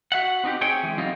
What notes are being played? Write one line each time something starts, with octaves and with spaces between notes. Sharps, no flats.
F#4 E5 F#5
C4 D#4 F#4 G4
C4 G#4 C#5 G5
E3 G#3
F#3 G3 A#3 C4 D#4